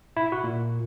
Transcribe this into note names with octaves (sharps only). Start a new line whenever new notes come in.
E4
F#4
A#2